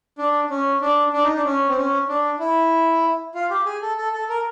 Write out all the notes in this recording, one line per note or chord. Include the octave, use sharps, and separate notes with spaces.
D4
C#4
D4
D4
D#4
D4
C#4
C4
C#4
D4
E4
F4
G4
G#4
A4
A4
A4
A#4